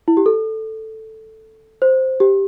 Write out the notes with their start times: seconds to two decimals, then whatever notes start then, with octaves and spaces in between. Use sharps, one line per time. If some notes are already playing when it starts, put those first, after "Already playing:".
0.08 E4
0.17 G4
0.26 A4
1.82 C5
2.20 G4